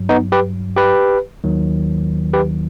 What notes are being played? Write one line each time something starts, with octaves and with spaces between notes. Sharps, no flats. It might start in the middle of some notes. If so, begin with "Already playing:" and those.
Already playing: G2 F#3
B3 D#4
G4 B4
G4 B4
D#2 D#3 F#3
G4 B4